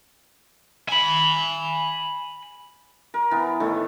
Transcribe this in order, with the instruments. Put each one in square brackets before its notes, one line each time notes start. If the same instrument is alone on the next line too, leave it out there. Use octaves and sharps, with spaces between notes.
[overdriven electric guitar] G#5 B5
[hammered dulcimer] A#4
E3 B3
A2 D#3 A3